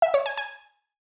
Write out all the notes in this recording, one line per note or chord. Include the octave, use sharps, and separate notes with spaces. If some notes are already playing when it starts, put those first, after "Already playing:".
E5
C#5
G#5
G#5